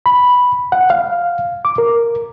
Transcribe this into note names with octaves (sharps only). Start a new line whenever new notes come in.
B5
F#5
F5
D6
A#4